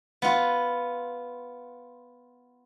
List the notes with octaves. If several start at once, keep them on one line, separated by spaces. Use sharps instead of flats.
B3 F4